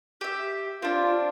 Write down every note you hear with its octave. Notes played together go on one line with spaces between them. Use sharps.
G4 E5
C4 D4 F4